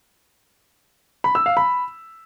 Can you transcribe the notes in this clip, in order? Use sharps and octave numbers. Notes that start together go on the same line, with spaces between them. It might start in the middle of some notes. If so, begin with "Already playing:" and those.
B5
E6
F5
B5